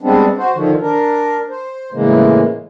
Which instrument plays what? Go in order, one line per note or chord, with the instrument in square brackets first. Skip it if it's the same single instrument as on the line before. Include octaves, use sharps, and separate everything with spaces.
[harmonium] G3 G#3 B3 C4 D4
F#4 C5
D3 D#3 F3
D4 A#4
C5
A2 C#3 E3 G#3 A#3